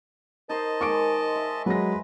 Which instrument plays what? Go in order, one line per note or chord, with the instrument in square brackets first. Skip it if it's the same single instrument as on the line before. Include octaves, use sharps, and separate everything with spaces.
[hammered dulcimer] D#4 C5 C6 [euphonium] A#4 [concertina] D#5 A5
[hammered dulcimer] D#3 G#3 [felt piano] C#6 D6 D7
[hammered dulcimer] E5
[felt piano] F#3 A#6 [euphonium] G#3 [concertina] B4